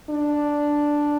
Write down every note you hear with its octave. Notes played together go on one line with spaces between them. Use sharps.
D4